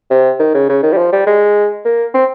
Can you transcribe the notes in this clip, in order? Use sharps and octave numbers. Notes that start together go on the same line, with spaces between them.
C3
D#3
C#3
C#3
D#3
G3
F3
G3
G#3
A#3
C4